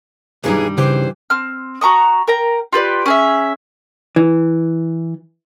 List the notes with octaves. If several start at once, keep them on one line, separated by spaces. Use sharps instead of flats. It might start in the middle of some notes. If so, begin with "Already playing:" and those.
B1 G2 D#3 E3 G3 D#4 G#4
C#3 E3 G4 C5
C4 F6
F#4 A#5 C#6 D#6
A#4 G5 A#5
F4 G4 B4 D5
C#4 G#4 E5
E3